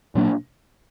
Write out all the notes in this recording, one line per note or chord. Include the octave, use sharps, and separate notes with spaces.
A#2 F#3 A#3 D4